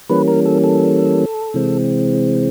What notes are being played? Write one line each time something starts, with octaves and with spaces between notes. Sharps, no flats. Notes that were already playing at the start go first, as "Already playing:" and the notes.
E3 G3 A#3 C#4 B4
A#4
A4
A4
C3 E3 G#3 C4